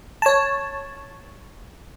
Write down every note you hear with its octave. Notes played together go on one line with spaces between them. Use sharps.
C#5 A5